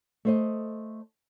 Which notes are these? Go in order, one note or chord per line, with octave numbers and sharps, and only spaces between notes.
A3 C5 D#5